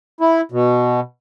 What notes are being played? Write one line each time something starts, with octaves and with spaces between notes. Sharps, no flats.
E4
B2